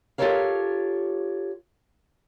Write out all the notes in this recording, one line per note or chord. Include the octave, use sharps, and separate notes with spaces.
F4 G4 A4 A#4 C#5 F5